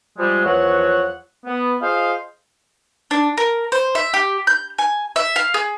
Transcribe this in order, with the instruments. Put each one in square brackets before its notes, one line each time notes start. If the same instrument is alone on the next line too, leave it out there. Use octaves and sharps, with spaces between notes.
[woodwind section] F3 G3 G#3
E2 F3 F#3 C#5 F#5
B3
F4 G#4 C5 D#5 F5
[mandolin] D4
A#4
C5
E5
G4
G6
G#5
E5
F5
G#4